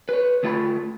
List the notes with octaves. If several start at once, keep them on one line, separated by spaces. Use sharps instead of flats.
B4 C#5
D2 A3 F4 D#5 A5 B5